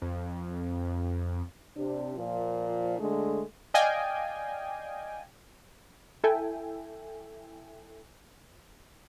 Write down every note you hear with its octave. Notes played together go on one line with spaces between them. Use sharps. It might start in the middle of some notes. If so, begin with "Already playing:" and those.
F2
C3 D4
A#2 F3
D3 G#3 A3
D5 D#5 F5 G5 G#5
E4 A4 E5 G5 G#5